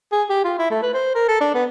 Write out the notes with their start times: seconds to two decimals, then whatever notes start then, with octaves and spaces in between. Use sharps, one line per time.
0.12 G#4
0.29 G4
0.44 F4
0.58 E4
0.70 A3
0.82 B4
0.94 C5
1.15 A#4
1.28 A4
1.41 D4
1.54 B3